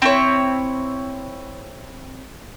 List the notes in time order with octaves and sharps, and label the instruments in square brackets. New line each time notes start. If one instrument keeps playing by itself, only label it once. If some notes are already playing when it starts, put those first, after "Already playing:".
[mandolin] C4 E4 C#5